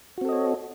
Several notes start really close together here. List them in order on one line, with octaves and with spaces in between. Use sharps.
F#4 C4 A4 D#5 C#5